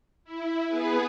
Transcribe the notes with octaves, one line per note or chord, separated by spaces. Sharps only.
E4
B3 G#4 B4